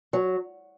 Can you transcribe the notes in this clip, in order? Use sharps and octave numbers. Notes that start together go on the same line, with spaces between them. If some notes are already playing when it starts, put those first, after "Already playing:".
F#3